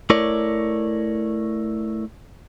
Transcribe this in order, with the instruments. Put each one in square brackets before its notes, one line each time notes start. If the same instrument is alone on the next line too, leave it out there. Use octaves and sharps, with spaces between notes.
[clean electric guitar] A3 E4 A#4 C#5 D5